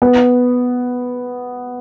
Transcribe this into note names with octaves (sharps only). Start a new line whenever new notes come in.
B3